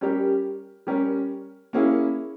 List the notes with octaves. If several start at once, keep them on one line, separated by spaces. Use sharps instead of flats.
G3 C#4 G4 A#4
G3 C#4 G4 A#4
A#3 C#4 E4 G#4